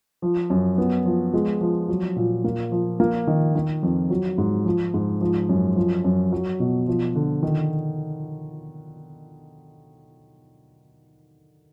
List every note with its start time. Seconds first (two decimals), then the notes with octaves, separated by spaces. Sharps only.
0.22 F3
0.50 F#2
0.78 B3
1.06 F3
1.34 G#3
1.61 F3
1.89 F#3
2.16 A#2
2.44 A#3
2.72 F3
3.00 A#3
3.27 D#3
3.55 D#3
3.83 F2
4.10 F#3
4.38 G#2
4.66 F3
4.94 G#2
5.21 F3
5.49 F#2
5.76 F3
6.04 F#2
6.32 F#3
6.60 B2
6.87 F3
7.15 D3
7.43 D#3